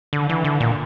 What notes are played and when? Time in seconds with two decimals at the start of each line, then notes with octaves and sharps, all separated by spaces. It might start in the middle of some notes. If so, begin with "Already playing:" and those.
0.13 D3
0.29 E3
0.44 D3
0.60 A#2